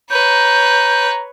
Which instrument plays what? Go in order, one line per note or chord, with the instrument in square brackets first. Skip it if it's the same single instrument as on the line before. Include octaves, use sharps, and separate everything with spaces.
[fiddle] B4 C#5 [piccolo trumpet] A#5 [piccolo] G6